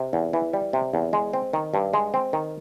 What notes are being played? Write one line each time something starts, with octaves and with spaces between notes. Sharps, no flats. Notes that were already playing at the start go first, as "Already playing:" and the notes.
Already playing: C3
E2
E3
G3
C3
E2
G#3
C4
D#3
G2
G#3
C4
D#3